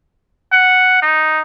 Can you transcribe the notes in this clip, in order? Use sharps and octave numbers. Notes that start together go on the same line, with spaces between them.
F#5
D#4